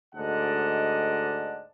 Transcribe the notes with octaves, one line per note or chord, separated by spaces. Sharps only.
D2 G#2 D5 D#5 F#5 A5